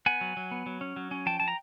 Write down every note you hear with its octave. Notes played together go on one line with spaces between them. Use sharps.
B3 F#5 G#5
F#3
F#3
B3
F#3
C#4
F#3
C#4
F3 G5 A5
F3 A5
A#5